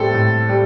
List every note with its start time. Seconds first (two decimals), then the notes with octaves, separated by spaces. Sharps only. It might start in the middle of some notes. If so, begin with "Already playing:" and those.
Already playing: A2 G3 C4 A4
0.14 A2
0.49 G3